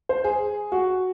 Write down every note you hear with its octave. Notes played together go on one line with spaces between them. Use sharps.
C5
G#4
F#4